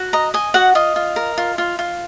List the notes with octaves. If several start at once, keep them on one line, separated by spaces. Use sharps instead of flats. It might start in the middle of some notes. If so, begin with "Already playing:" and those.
Already playing: F#4
D#5 A#5
D#5 G#5
F#4 F#5
F4 D#5
F4
A#4
F4
F4
F4